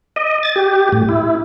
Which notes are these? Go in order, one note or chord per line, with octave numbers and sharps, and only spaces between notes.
D#5
A6
G4
A2
E4